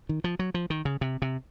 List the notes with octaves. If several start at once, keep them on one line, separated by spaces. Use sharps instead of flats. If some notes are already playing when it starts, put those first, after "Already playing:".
D#3
F3
F#3
F3
D#3
C#3
C3
C3